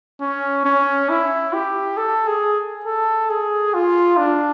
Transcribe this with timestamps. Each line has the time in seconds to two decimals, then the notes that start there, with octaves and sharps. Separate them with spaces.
0.21 C#4
0.65 C#4
1.09 E4
1.53 G4
1.97 A4
2.27 G#4
2.85 A4
3.30 G#4
3.74 F4
4.17 D4